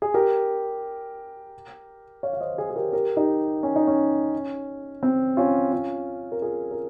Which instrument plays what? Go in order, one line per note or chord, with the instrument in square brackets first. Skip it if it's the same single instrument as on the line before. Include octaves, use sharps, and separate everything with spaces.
[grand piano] G#4
G4 A#4
C#5 F5
F5
C5 D#5
G#4 C5
G#4
G4 A#4
G4 A#4
D#4 G4
C#4
D#4
C#4
C4
C#4 F4
C#4 F4
A#4
F4 G#4
A#4